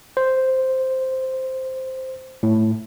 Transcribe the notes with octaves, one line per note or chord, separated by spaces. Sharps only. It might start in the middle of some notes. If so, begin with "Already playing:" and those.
C5
A2